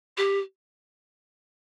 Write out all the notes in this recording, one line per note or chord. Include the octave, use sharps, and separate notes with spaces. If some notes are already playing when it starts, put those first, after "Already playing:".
G4